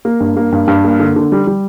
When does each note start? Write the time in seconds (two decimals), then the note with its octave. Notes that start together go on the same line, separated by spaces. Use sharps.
0.05 A#3
0.20 G2
0.36 A#3
0.52 G2
0.68 G2
0.84 A#3
0.99 D3
1.16 D3
1.32 G3
1.47 G3